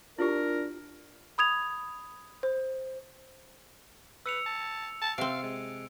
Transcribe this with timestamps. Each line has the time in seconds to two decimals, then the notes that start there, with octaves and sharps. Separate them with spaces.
0.19 D4 E4 F4 G4 A#4
1.38 B5 D#6 G#6 F7
2.43 C5
4.26 B4 E6 C#7 F7
4.46 A5
5.01 A5
5.18 C3 C4 F5 D7
5.43 G#3